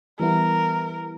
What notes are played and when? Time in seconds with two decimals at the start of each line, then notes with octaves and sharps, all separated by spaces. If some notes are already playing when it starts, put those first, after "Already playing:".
0.20 E3 G3 B3 E4 A#4